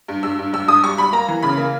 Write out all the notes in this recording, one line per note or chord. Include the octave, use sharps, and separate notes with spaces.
G2
G2 E6
G2
G2 E6
G2 D#6
G3 C#6
G3 B5
A#3 A#5
E3
C#3 B5
A#3